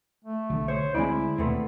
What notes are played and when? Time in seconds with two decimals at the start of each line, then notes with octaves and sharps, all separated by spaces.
0.24 A3
0.50 B1 D3
0.68 C5 C#5
0.95 D2 G#3 C4 E4 D5
1.38 D#2 B2 A3 B3 C4